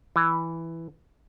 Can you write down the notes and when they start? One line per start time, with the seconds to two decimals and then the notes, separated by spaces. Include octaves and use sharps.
0.16 E3